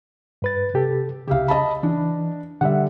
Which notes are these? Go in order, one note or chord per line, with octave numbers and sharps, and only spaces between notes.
G2 B4 A6
C3 G4 A4
C2 C#3 G4 E5 F5
D#5 A5 B5
E3 D4
D3 G3 E5 F#5